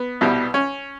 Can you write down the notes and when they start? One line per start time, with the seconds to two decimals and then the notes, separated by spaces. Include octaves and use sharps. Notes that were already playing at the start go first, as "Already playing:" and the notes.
Already playing: B3
0.21 C2 B2 G3
0.54 C#4